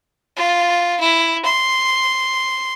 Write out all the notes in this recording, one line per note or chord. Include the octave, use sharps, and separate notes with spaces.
F4
E4
C6